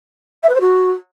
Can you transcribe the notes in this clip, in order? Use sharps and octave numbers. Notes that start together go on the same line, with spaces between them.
E5
B4
C5
F#4